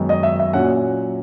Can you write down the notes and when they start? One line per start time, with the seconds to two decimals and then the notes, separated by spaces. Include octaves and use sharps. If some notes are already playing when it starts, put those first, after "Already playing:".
Already playing: F#2 D#3 G#3 B3
0.09 D#5
0.23 E5
0.39 E5
0.53 A#2 F#3 C#4 F#5